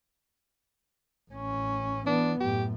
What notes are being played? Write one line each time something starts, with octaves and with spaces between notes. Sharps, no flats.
A1 C#4
E3 B3 D4
F#2 A2 G4